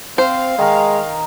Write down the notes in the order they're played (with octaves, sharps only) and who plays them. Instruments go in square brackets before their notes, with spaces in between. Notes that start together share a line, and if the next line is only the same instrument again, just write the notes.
[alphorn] C4 [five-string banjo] C5 [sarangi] F5
[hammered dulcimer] D#3 A#4 [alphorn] G#3